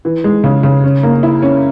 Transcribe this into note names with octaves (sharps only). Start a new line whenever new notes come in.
E3
G#3
C#3
C#3
C#4
A#3
E4
C#4